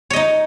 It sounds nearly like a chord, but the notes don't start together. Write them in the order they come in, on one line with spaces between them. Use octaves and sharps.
C#5 D#5 D#4